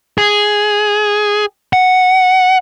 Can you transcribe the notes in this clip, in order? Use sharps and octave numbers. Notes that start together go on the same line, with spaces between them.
G#4
F#5